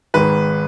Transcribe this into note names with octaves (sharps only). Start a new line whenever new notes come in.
G#1 G#2 D#3 G#3 B4